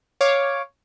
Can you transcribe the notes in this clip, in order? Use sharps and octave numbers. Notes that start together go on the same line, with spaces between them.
C#5 F5 D6